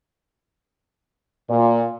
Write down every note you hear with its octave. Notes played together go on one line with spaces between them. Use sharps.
A#2